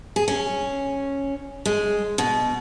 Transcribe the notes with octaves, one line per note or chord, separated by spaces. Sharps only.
G#4
C#4
G#3
B2